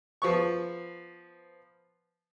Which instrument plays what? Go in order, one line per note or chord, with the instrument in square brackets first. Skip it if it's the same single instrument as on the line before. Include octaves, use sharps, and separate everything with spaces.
[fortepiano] F3 B3 C#6